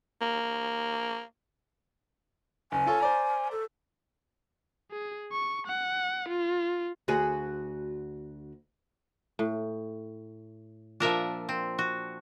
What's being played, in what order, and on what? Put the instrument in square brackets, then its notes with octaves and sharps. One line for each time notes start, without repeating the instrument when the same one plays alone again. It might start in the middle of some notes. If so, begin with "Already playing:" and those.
[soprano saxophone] A#3
[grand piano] F#1 [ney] G#5
[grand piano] F4 A4 C#5
C5 D5 A#5
[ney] A4
[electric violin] G#4
C#6
F#5
F4
[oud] D2 F#4 G#4
[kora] A2
[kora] A#2 F3 [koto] D4 A#4 E5
[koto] C4
F#4